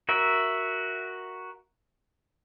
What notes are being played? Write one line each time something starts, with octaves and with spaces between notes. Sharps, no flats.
F#4 A#4 E5